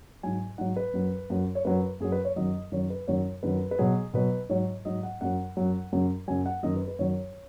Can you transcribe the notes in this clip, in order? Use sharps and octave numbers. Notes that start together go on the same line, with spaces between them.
G#2 F#3 G#5
G#2 F#3 F#5
B4
F#2 F#3
F#2 F#3
C#5
F#2 F#3 B4
F#2 F#3 G#4
B4
C#5
F#2 D#3 F#3 D#5
F#2 D#3 F#3 C#5
B4
F#2 D#3 F#3 C#5
F#2 D#3 F#3 B4
B4
B2 F#3 G#4
B2 F#3 B4
G#2 F#3 C#5
G#2 F#3 D#5
F#5
F#2 F#3 F#5
F#2 F#3
F#2 C#3 F#3
F#2 C#3 F#3 G#5
F#5
F#2 D#3 F#3 D#5
B4
B4
F#2 D#3 F#3 C#5